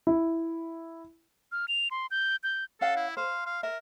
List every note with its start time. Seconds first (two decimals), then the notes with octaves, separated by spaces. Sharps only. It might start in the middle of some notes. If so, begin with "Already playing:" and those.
0.07 E4
1.52 F6
1.68 F7
1.91 C6
2.11 G6
2.43 G6
2.81 C#4 A4 F5 F#5
2.96 E4
3.17 C5 F5
3.46 F5
3.63 A#4 E5